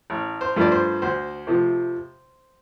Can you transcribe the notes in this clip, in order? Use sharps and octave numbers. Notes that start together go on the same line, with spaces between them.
A1
C5
G2 F3 A3 D5
C5
D2 C5
C3 F3 A3